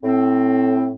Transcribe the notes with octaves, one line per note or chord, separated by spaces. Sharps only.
A2 C4